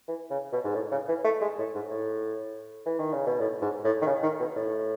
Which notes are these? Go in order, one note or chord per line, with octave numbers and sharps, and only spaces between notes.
E3
C#3
B2
G#2
A2
C#3
E3
A3
G#3
A2
G#2
A2
E3
D#3
C#3
B2
A2
G#2
A2
D#3
C#3
D#3
B2
A2